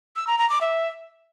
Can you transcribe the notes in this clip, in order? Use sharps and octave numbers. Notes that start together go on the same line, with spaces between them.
E6
A#5
A#5
D6
E5